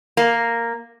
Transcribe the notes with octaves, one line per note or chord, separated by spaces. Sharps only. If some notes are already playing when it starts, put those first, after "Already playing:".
A#3